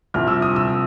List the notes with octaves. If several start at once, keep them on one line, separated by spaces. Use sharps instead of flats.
C2 C3 F3 F6
E6
D#6
E6